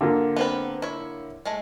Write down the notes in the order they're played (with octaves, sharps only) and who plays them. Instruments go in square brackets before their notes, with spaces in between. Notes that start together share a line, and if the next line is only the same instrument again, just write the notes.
[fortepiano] D3 A#3 F4
[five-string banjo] B3 C4 B4
E4 C#5
G#3 A3